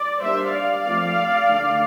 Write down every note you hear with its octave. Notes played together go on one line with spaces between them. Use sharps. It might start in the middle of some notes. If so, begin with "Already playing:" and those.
Already playing: D5
G3 A#3 D4 C5 E5
D5 F5
F3 A3 C4
D3 A3 D4